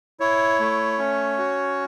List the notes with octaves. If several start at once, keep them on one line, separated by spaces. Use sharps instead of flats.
E4 C#5
A3
C#4
F#4